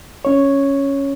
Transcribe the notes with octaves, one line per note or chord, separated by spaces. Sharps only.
C#4 C#5